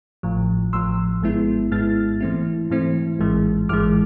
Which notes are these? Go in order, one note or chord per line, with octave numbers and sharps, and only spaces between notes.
A1 A2 F3
A1 A2 F3 C6 E6
G#1 G#2 G#3 B3 E4
G#1 G#2 G#3 B3 E4 F6 A6
G#2 E3 A3 C4 E4
G#2 E3 A3 C4 E4
A1 G#2 E3 G#3
A1 G#2 E3 G#3 D6 F6